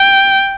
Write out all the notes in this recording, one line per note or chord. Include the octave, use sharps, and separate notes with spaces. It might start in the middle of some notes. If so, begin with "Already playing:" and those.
Already playing: G5